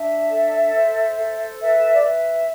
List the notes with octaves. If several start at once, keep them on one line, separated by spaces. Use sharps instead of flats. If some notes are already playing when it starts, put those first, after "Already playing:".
Already playing: D4 E5
A4
C5
A4
B4 E5
D5
B4 E5